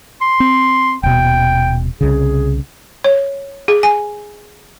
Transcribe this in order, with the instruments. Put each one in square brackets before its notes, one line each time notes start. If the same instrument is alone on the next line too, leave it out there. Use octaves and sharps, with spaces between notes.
[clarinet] C6
[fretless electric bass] C4
[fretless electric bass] D#1 B2 [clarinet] G5
[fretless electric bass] C2 C#3 [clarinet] G#4
[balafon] C#5
G#4
G#5